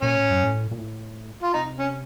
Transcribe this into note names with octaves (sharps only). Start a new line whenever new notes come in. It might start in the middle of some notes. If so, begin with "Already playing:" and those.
A#2 C#4
A2
F#2
A2
A#2
A2
F4
C3 D#4
C#4